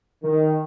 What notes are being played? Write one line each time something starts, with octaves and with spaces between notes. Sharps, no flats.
D#3